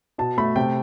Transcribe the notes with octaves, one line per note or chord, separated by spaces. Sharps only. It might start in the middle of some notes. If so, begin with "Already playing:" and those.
B2 A5
A3 B5
C3 G5